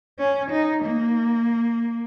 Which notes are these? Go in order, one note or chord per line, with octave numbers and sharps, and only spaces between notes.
C#4
D#4
A#3